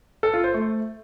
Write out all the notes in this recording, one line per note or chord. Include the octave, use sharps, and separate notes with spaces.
A4
F4
C5
A3